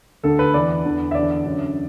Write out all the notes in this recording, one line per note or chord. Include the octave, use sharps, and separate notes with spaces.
D2 D3 A4
B4
E2 E3 D5
E2 D3
E5
E2 D3 D5
F#2 D3